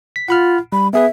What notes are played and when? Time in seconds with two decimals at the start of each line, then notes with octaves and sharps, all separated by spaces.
0.16 B6
0.28 F4 F#5 B5 F6
0.72 G3 B5
0.93 B3 G#4 B4 E5